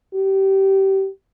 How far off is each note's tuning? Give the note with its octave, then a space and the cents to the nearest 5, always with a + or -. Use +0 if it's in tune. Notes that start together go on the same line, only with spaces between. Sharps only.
G4 -25